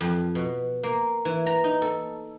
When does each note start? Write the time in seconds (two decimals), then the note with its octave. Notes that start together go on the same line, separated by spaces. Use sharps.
0.01 F2
0.35 B2
0.83 A#3
1.25 E3
1.46 A#5
1.64 D#4
1.82 A4